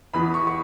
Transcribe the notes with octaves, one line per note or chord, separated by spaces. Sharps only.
E2 E3 B3 B5
C#6
C#6